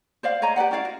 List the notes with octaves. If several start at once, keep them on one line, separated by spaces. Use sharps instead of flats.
C5 D5 F5
C#5 D#5 G#5 A#5
G4 B4 D5 F#5
C#4 E4 D5 F5
F#4